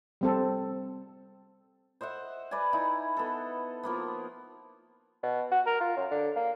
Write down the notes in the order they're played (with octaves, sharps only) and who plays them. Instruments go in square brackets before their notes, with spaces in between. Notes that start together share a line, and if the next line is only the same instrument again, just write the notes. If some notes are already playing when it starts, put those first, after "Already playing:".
[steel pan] G3 C4 A4
[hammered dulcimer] C5 D#5 E5 F#5
B4 D5 E5 G#5
D#4 E4 F#5
B3 A4
F3 A#3 B3
[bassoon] B2
F#4
A#4
F4
F#2
D3
A#3